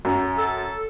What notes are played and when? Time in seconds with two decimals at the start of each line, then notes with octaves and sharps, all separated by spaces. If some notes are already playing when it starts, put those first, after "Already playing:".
0.05 F#2
0.38 A4